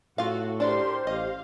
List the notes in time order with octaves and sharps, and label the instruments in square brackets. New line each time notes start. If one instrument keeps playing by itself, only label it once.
[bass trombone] A2 [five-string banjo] F4 F5 [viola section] F#4 A4
[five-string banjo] D4 D5 [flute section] G4 C5 [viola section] A#4 C6
[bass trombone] A1 [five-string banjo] D#5 [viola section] F5